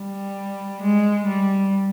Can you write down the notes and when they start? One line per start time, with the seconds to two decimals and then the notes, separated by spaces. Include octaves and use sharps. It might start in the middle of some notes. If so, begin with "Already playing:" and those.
Already playing: G3
0.82 G#3
1.27 G3